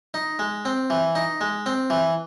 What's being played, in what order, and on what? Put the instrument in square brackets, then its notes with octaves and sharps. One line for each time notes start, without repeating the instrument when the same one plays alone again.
[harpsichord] D#4
G#3
C4
E3
D#4
G#3
C4
E3